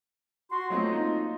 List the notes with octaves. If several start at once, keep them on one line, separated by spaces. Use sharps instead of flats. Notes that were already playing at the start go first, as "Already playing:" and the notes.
F#4 C6
F#3 A3 A#3 C4 F4 D#5
D#4